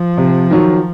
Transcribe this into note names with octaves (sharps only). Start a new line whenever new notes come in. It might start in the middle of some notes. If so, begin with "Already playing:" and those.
Already playing: F3
C3
D#3 F#3